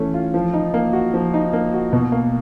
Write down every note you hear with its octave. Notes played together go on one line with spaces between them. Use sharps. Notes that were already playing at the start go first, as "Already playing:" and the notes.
Already playing: E3 A3 C#4
F4
F3
D#4
A#3
F#4
F3
D#4
A#3
F#4
B2
A#3